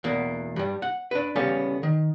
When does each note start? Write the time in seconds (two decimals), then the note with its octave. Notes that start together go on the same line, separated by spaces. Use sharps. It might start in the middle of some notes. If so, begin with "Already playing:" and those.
0.04 E2 B2 A#3
0.56 G2 G3
0.82 F#5
1.11 D4 B4
1.36 C#3 G3 B3 C#4 A4 F5
1.83 D#3